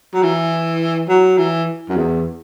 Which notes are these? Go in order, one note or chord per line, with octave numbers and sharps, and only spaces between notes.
F#3
E3
F#3
E3
F#2
E2